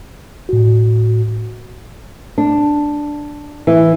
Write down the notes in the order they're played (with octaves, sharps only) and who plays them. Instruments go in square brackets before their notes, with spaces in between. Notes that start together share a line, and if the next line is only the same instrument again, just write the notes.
[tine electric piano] A2 F#4
[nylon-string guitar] D4
E3